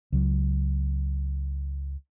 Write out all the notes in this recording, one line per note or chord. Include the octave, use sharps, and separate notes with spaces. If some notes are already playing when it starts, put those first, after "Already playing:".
C#2 F#3